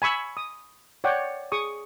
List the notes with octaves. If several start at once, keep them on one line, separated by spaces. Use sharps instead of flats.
G#5 B5 C#6 E6
D#6
C#5 D5 F#5 G5
G#4 C#6 D#6